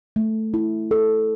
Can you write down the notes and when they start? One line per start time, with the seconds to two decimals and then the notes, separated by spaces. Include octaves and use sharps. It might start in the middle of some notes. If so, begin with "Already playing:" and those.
0.16 A3
0.54 E4
0.91 A4